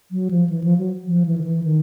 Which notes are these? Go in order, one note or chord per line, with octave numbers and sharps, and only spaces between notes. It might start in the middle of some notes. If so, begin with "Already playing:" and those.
F#3
F3
E3
F3
F#3
F3
E3
D#3
E3
D#3